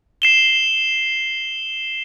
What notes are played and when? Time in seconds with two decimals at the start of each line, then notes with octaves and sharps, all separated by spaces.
0.22 C7 E7 G7